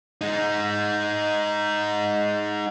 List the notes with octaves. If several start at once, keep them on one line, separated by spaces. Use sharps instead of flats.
G#3 D#4